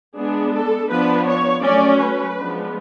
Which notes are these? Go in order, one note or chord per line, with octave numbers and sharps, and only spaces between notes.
G#3 B3 D4 G#4
A4
F3 B3 D4 B4
C#5
F#3 A3 C#4 D5
B4
F3 G#3 B3 D4